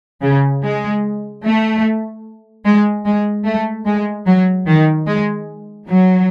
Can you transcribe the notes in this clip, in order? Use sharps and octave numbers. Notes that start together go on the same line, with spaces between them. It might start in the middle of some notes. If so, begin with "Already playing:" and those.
C#3
G#3
A3
G#3
G#3
A3
G#3
F#3
D#3
G#3
F#3